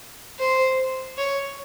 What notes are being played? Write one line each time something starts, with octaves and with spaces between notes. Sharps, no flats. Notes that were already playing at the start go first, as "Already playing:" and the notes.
C5
C#5